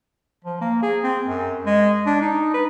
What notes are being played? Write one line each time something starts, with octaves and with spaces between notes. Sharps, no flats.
F3
A#3
G#4
C4
F#2
G#3
D4
D#4
B4